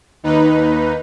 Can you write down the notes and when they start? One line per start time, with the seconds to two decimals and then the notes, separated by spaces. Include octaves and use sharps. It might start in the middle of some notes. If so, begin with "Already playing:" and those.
0.23 D#2 D#4 B4